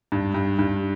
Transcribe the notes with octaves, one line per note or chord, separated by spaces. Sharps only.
G2
G2
G2